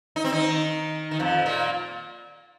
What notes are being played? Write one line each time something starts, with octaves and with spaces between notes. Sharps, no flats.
D#4
C4
D#3 D#4
D#3
F2 F3
A#2 A#3